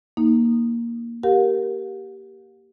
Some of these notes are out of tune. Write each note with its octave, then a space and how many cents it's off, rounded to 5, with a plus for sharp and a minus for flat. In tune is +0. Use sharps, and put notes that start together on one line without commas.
A#3 +5 D#4 +0
G4 -10 A#4 +0 F5 +45